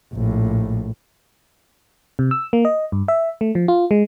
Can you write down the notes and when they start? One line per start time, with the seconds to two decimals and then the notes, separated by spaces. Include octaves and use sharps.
0.14 A#1 A2
2.19 C3
2.31 E6
2.53 A#3
2.65 D#5
2.92 G2
3.08 E5
3.41 A3
3.55 F3
3.68 F4
3.91 G#3